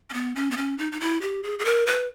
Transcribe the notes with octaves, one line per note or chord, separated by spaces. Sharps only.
C#4
B3
C#4
B3
C#4
D#4
D#4
E4
G4
G#4
G#4
A#4
B4